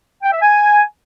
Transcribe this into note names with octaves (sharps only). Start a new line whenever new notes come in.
G5
E5
G#5